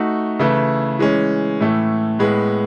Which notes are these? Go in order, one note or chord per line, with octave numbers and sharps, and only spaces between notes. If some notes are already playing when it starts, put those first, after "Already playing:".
Already playing: A3 D#4 F#4
C#3 E3 A3 E4 B4
E3 G#3 C#4
A2 E3 A3
A2 G#3 B3